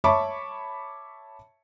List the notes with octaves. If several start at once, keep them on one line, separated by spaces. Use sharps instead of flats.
C#5 E5 A5 B5 C#6 D6